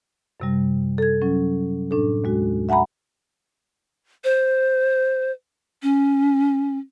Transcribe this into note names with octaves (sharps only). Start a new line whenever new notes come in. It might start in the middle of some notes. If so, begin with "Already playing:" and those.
F#2 C3 G3
A4 G#6
F#3 C#4
A2 D4 A4
D#2 G#3 F#4
E5 F#5 G#5 A#5 B5
C5
C#4